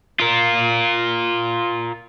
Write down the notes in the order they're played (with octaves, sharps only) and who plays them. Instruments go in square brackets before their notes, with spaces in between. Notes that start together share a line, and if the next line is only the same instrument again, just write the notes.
[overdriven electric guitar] F4 A#4